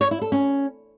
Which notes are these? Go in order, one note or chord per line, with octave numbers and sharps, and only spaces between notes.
C#5
E4
A4
C#4